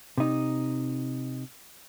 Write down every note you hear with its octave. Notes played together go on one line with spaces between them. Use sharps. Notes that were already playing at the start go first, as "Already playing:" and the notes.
C3 D#4